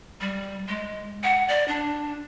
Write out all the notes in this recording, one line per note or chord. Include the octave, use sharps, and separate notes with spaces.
G3
G#3
F#5
D5
D4